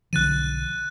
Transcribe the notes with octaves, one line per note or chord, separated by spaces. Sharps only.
B1 D3 F3 F#6 A6 D#7